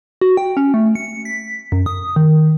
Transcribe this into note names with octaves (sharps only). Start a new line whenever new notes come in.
F#4
G5
C#4
A3
C#7
B6
F#2
D#6
D#3